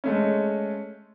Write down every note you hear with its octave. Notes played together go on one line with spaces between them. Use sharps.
G#3 A3 C#4